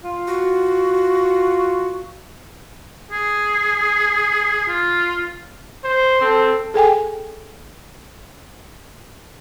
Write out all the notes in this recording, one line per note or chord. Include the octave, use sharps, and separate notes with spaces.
F4
F#4
G#4
F4
C5
C4 A4
G#4 A4 G5 G#5